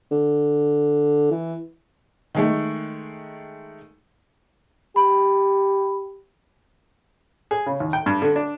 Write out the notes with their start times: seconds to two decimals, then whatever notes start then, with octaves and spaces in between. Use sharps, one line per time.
0.12 D3
1.31 E3
2.35 D#3 G#3 A3
4.96 G4 B5
7.51 G#4
7.66 C#3
7.80 D#2
7.93 G5
8.06 G2
8.22 D3
8.36 D4